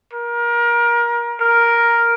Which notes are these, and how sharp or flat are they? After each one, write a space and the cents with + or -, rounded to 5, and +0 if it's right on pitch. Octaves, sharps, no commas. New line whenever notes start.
A#4 +25
A#4 +5